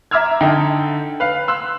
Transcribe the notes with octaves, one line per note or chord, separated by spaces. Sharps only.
E5 A#5 D6 E6 F6 G#6
D3 D#4 A4 G5
B4 F5
C6 E6 F#6